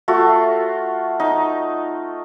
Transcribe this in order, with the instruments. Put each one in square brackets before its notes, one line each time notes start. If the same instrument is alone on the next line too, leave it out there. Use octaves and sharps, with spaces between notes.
[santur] A3 F4 F#4
D#4